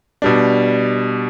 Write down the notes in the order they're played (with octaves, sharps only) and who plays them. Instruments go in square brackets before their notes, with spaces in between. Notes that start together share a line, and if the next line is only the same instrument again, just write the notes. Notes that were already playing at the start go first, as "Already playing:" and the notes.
[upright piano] B2 G3 D4